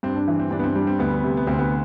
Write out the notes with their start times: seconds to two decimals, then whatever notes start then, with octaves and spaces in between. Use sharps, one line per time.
0.03 G2 C4
0.16 D4
0.28 E3
0.39 C4
0.51 G2 D4
0.59 B3
0.64 C4
0.75 G3 D4
0.87 C4
0.99 D2 B3
1.23 C3
1.37 B3
1.47 D2 C4
1.59 B3